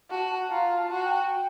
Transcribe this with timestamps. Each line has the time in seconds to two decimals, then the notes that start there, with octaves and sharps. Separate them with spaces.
0.10 F#4 A5
0.31 A5
0.41 A5
0.50 F4 A#5
0.77 A5
0.90 F#4
1.04 G5